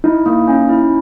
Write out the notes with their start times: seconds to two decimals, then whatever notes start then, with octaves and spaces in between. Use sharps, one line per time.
0.04 D#4 E4
0.26 A#3
0.48 C#4
0.69 E4